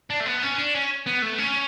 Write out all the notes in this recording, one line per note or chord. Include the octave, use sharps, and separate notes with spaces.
D4
A3
B3
C#4
D4
C#4
B3
A3
C#4